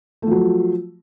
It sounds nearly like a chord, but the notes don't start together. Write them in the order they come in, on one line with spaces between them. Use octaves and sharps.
A3 F3 F#3